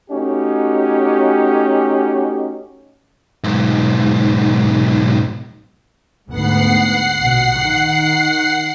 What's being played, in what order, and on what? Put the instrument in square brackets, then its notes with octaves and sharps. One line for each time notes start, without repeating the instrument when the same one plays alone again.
[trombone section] A3 C#4 D#4 F#4 G4
[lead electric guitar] B1 G#2
[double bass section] D2 G#2 B3 [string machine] F#5 C7
[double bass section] A#1 B2
D#3